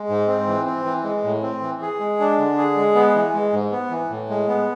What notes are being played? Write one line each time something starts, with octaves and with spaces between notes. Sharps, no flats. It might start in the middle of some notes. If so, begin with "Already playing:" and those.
Already playing: G#3
G#2
C4
E3
C4
E3
G#3
A2
C4
E3
G#4
G#3
D4
D3
G#4
G#3
B3
E3
G#3
G#2
B3
E3
A2
G#3
B3